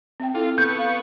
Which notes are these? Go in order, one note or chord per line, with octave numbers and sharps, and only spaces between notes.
C4 E5 G5
E4 F4 A4
B3 C#6 G6
F5